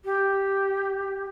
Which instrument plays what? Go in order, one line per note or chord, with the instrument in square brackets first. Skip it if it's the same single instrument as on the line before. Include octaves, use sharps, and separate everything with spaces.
[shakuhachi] G4